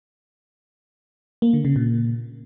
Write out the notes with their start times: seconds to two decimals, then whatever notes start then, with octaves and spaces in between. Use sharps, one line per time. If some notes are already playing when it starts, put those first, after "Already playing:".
1.42 A#3
1.53 D3
1.65 C#3
1.76 A#2